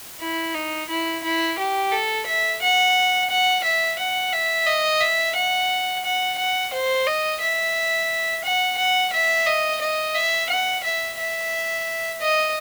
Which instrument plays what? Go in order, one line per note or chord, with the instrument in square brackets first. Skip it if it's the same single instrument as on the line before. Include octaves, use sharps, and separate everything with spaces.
[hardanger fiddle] E4
D#4
E4
E4
G4
A4
E5
F#5
F#5
E5
F#5
E5
D#5
E5
F#5
F#5
F#5
C5
D#5
E5
F#5
F#5
E5
D#5
D#5
E5
F#5
E5
E5
D#5